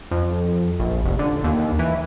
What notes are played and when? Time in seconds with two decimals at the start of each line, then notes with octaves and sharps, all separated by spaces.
0.11 F2
0.80 A#1
1.04 F1
1.19 D3
1.44 D#2
1.79 E3